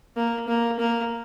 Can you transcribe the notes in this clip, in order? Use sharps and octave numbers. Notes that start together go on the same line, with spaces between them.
A#3
A#3
A#3